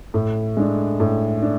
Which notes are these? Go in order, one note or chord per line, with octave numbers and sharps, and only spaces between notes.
A2
G#3 D4
A2
D4